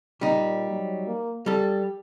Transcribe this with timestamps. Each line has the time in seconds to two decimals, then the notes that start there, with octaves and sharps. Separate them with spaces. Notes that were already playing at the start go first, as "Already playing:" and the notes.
0.21 A#2 G3 D#4
0.70 F#3
1.07 A#3
1.46 G3 G4 A4